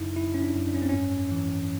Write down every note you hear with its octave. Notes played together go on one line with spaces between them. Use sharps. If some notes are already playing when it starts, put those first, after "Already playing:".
Already playing: F#2 C#3 D#4 E4
F#2 E4
C#4
D4
F#2
D4
C#4
C4
G#2 C#4
E3